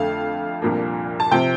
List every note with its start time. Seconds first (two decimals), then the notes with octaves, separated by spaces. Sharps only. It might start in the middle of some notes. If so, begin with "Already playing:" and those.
Already playing: F2 D3 A3 F5
0.62 C2 A#2 F3 A#3 D4
1.20 A5
1.31 C3 F3 C4 G5